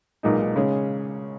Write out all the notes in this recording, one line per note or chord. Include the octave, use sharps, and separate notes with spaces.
B1 A#2 G#3 D#4
C#3 G#3 C#4